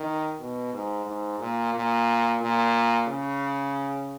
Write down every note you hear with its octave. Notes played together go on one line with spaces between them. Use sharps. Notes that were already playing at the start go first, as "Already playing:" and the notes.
Already playing: D#3
B2
G#2
G#2
A#2
A#2
A#2
C#3